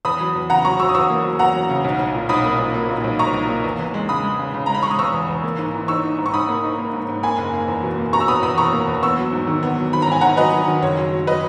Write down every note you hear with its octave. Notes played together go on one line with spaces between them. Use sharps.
E2 B5 D#6
F#3
E2
C#3 F#5 A#5
F#3 A#5 C#6
F#3 C#6 E6
D#6
E2 C#6 E6
A#3
F#3
E2 F#5 A#5
F#3
C#3
B1
B1
A#2
B1 B5 D#6
A#3
B1
A#3
A#2
B1
B1 A#5 C#6
B1
A#3
E2
E2
G#3
C#3 B5 D#6
G#3
C#3
C#3
G#3 A#5
B5
G#3 C#6
D#6
E2 C#6 E6
E2
E2
A#3
G#2
E3
D#4 C#6 E6
D#4
G#2
C#6
G#2 B5 D#6
A#3
D#4
A#3
G#2
G#2
A#3 G#5 B5
F#1
A#3
E2
B2
A#3
B2 A#5 C#6
E6
B2 B5 D#6
E2 B5 D#6
B2 A#5 C#6
A#3
E2
B3 C#6 E6
F#3
G#2
D#3
B3
F#3
D#3 B5
A#5
G#2 G#5
D#3 F#5 A#5
F#3 B4 D#5
F#3
D#3
F#1 C#5
F#3
F#3
F#3 B4 D#5